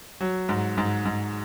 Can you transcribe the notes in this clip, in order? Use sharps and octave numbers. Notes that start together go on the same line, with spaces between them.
F#3
G#2
G#2
G#2